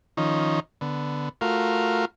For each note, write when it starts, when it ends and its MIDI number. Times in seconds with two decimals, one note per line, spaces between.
0.17 0.60 51
0.17 0.60 53
0.17 0.60 61
0.17 0.60 63
0.81 1.29 50
0.81 1.29 59
1.41 2.05 57
1.41 2.05 65
1.41 2.05 66
1.41 2.05 70
1.41 2.05 77